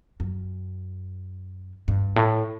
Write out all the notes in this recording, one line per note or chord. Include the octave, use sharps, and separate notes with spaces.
F#2
G2
A2